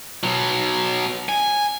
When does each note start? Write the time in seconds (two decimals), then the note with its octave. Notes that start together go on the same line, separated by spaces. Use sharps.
0.24 B2 F#3
1.29 G#5